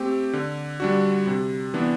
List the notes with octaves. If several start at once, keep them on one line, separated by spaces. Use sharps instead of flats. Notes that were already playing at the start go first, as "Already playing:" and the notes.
Already playing: A3 C4 G4
D3
G3 D4 F#4
C3
E3 B3 D4